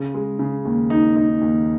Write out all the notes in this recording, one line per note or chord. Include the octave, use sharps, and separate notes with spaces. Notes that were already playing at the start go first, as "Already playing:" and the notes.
Already playing: C#3
G#3
C#3
D#2
D#4
D#4
D#2